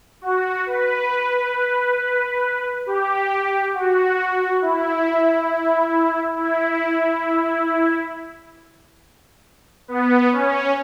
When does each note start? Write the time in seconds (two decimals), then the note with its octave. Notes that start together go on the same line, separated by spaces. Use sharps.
0.21 F#4
0.66 B4
2.86 G4
3.74 F#4
4.62 E4
6.37 E4
9.88 B3
10.32 C#4